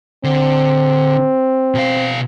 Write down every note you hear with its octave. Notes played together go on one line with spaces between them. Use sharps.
D3 C4
B2 F5